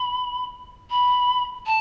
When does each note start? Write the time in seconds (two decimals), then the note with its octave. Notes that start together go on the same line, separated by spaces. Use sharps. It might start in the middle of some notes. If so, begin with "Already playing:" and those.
Already playing: B5
0.90 B5
1.66 A5